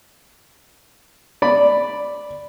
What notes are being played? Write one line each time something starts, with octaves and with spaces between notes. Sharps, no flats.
D5 B5